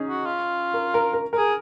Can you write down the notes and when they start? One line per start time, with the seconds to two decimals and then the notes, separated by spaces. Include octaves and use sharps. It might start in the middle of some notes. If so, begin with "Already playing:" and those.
Already playing: C#4 D#4 G#4
0.09 F#4
0.26 F4
0.74 A#4
0.94 A#4
1.13 A#4
1.33 G#4 A#4